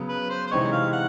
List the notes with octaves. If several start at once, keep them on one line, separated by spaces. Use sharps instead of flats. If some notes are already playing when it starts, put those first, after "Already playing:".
Already playing: C#3 F#3 B3
B4
C5
C5
C3 E3 G#3 C4 D#4 C#5
F5
F#5